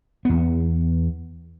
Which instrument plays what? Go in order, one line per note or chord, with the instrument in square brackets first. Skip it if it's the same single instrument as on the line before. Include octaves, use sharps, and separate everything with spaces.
[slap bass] E2 B3